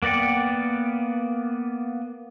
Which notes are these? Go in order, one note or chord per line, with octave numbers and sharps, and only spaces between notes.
A#3 B3 D5 F#5 G5